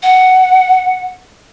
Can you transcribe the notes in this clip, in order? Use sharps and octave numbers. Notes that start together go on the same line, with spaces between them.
F#5